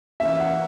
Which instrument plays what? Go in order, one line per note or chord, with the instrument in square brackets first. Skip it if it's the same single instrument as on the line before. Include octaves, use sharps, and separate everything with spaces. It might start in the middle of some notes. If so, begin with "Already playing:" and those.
[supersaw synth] E3 A#3 C#4 [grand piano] E5
[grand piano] F#5